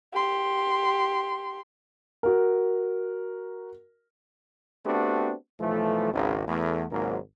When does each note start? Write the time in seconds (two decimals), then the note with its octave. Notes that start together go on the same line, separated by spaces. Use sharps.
0.13 G4 C6
2.23 F#4 A#4
4.86 A3 B3 C4 D4 F#4 G4
5.60 B1 E3 F3 A3
6.13 G#1 C#2
6.48 E2 A3
6.91 G#1 C#2 G#2 F#3 A#3 A#4